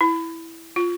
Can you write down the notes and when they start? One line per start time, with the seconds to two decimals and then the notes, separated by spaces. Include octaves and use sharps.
0.01 E4
0.76 F4